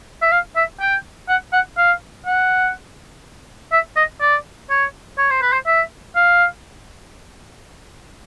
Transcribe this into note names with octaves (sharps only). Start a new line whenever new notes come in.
E5
F5
E5
G5
F#5
F#5
F5
F#5
E5
D#5
D5
C#5
C#5
C5
B4
C5
E5
F5